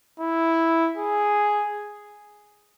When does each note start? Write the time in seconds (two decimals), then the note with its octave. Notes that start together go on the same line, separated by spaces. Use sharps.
0.20 E4
0.97 G#4